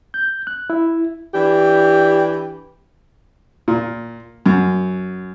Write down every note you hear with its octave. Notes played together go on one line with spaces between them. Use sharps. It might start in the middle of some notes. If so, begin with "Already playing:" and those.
G6
F#6
E4
E3 D4 G4
A#2
F#2